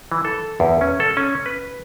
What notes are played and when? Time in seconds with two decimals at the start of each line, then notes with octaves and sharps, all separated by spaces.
0.12 E3
0.25 A4
0.60 E2
0.81 C#4
1.00 A4
1.17 C#4
1.46 B4